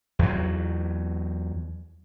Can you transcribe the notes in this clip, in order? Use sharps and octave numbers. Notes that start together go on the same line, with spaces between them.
E2 F#3